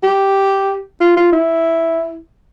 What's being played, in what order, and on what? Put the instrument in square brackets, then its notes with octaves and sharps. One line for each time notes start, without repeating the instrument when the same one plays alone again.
[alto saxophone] G4
F4
F4
E4